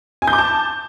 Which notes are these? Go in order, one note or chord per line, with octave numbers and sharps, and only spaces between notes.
G#5
G6
D6
A5